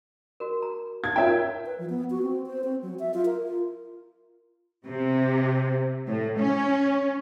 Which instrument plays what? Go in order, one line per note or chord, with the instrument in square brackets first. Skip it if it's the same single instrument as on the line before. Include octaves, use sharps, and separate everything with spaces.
[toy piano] F#4 A#4
A#5
[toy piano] D#4 [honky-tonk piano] G#6
[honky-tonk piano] F4 E5 G5 [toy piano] A#4 C#5 A#5
[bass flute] B4
F3
B3
F#4
C4
C5
C4
F#3
E5
F4
A#4
F4
[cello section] C3
A2
C#4